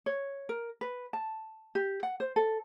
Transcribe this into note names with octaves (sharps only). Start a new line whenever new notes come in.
C#5
A#4
B4
A5
G4
F#5
C5
A4